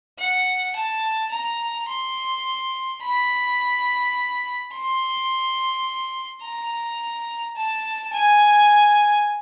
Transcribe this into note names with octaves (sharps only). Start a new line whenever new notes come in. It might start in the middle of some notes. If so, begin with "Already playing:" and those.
F#5
A5
A#5
C6
B5
C6
A#5
A5
G#5